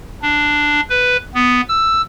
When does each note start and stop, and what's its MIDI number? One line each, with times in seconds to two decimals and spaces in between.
0.22 0.81 62
0.89 1.17 71
1.35 1.61 59
1.69 2.02 88